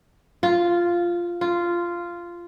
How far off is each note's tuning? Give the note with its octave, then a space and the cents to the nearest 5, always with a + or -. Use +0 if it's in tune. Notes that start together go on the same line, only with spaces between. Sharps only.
F4 -5
F4 -10